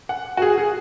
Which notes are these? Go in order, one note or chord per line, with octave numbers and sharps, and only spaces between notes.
F#5
F#4
G#4
G#4